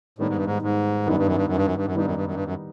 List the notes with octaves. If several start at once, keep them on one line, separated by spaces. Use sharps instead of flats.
A2 D#3 G3 B3 D#4
G#2
G2
G#2
G#2
F#2 D#3 G3 B3 D#4
G2
F#2
G2
F#2
G2
F#2
G2
F#2
G2 D#3 G3 B3 D#4
F#2
G2
F#2
G2
F#2